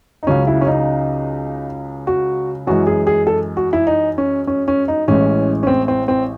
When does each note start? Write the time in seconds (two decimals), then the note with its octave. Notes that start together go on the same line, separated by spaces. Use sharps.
0.23 D#4
0.27 C#2 C#3 F#3 C#4
0.47 E4
0.61 C#4
0.67 D#4
2.07 F#4
2.67 F#2 E3 G#3 F#4
2.87 G#4
3.07 G#4
3.27 A4
3.57 F#4
3.73 E4
3.87 D#4
4.18 C#4
4.47 C#4
4.68 C#4
4.88 D#4
5.08 A1 A2 E3 G#3 C#4
5.63 C#4
5.67 C4
5.88 C4
6.08 C4